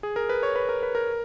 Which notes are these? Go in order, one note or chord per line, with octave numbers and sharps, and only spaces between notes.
G#4
A#4
B4
C#5
B4
A#4
B4
A#4